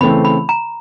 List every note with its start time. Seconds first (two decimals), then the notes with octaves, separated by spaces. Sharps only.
0.01 C#3 E3 A3 C4 B5
0.25 B5
0.49 A#5